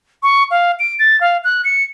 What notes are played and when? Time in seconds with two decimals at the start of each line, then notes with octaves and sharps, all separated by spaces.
0.23 C#6
0.51 F5
0.79 D7
0.99 A6
1.21 F5
1.44 F#6
1.65 C#7